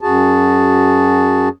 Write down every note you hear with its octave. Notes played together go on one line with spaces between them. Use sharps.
F#2 F#4 G#4 A5